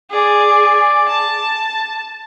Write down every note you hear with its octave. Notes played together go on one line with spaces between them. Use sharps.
G#4 D5
A5